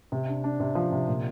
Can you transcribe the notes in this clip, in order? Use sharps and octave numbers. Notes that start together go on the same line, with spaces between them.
C3
D4
D4
C3
F3
C3
A#2